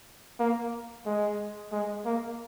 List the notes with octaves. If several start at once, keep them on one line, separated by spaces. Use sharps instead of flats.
A#3
G#3
G#3
A#3